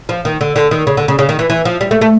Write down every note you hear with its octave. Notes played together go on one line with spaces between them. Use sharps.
F3
D#3
D3
D3
D#3
C#3
D3
C#3
C#3
D#3
E3
E3
F3
G3
A3
A3